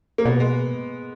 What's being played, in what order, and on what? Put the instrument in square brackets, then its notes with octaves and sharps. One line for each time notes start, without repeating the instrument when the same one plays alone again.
[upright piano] A#3
[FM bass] B2 [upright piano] B3
[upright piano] G#3